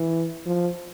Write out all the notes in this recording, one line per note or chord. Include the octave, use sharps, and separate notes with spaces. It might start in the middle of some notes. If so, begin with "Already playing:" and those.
Already playing: E3
F3